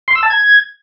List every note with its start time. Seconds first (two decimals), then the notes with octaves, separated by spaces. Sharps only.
0.08 C6
0.15 E6
0.23 A5
0.30 G#6